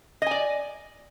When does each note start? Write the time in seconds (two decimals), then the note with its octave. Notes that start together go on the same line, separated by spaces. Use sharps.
0.22 D#5
0.26 G#5
0.31 D5